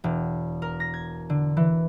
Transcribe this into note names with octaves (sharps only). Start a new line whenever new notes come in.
E1
A#4
A#6
G#6
D3
E3